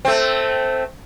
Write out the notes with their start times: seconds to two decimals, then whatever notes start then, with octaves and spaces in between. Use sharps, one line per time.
0.05 A3 C4